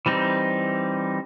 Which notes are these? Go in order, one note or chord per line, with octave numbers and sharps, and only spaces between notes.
E3 G3 C4 D#4